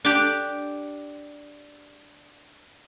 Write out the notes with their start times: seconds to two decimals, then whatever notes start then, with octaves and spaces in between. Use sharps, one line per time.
0.05 D4 G4